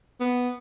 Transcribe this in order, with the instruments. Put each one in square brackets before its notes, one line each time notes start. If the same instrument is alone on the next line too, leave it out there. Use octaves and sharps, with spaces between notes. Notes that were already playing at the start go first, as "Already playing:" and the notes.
[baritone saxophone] B3